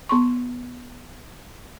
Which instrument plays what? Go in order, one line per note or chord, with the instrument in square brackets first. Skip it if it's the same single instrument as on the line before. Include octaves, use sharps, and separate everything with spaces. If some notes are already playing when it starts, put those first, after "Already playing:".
[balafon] B3 C6 C#6